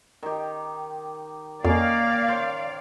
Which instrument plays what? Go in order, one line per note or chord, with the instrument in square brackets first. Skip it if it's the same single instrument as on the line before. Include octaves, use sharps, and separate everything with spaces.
[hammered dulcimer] D#3 G4
[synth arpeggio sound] F2 [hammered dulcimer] D#3 C#4 [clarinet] A#3 [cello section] D5 F5
[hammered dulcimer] C5 C#5